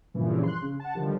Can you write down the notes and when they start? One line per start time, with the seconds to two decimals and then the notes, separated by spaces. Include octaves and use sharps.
0.14 G2 A#2 C#3 E3 F3
0.43 C6 F#6
0.62 C#3
0.80 F#5 A5
0.95 D3 D#3 F3 G3